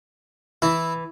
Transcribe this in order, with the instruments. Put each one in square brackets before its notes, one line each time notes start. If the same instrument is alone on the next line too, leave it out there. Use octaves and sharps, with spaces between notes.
[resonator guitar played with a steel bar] E3 [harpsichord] E4